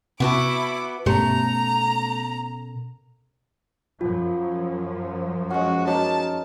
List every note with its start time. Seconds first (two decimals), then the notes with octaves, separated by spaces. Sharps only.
0.20 C3 B3 E4 F#4 A5 D6
1.06 G2 B2 A3 C#4 G4 A#4 A#5 C6
4.01 F#2 F3 F#3 F4
5.51 G#3 C#4 F#4 F#5
5.87 A#3 D#4 F#4 A#4 C#5 D#5 A5